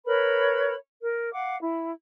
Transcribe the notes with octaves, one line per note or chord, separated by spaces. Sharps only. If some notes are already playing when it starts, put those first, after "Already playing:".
A#4 B4 C#5 B5
A#4
F5 F#5 D6
E4